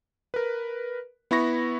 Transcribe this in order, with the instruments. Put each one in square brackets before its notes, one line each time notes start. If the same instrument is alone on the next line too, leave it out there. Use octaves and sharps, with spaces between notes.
[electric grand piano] A#4 B4
B3 E4 B5 C#6 A#6